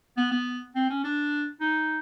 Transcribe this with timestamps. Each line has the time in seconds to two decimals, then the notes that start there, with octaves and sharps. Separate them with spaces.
0.17 B3
0.32 B3
0.76 C4
0.90 C#4
1.04 D4
1.61 D#4